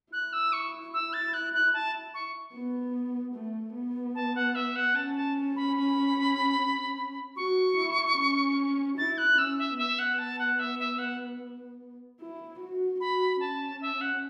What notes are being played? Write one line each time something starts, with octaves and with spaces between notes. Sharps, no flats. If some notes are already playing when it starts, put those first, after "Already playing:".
E4 F#6
E6
C#6
E6
A6
F#6
F#6
A5
C#6
B3
A3
B3
A5
F#5
E5
F#5
C#4 A5
A5
B5
B5
F#4 C#6
E4
C#4
E4 A6
F#6
C#4 E6
E5
B3 E5
F#5
A5
F#5
E5
E5
F#5
E4
F#4
F#4 B5
C#4 A5
E5
F#5